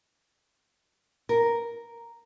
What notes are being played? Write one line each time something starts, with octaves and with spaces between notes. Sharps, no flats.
A#4